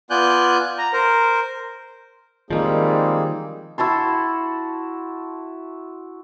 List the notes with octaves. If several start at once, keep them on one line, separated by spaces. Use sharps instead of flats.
B3 F4 D5 G#5 F#6 G6
A#5
A#4 C5
D#3 F3 G3 G#3 A#3 C4 D#4 G#4
E4 F#4 A5 C6